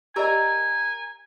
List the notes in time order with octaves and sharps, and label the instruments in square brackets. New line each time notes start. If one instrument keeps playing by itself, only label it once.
[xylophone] G4 D5 D#5 [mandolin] A#4 A#5 E6 [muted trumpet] G#5